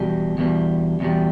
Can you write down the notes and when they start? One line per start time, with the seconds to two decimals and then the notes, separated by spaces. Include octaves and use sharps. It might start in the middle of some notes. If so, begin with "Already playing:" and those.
Already playing: E2 B2 G3
0.38 E2 B2 G3
1.00 E2 B2 G3